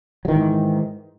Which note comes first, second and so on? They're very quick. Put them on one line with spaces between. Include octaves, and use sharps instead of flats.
F#3 D#3 E3 G#2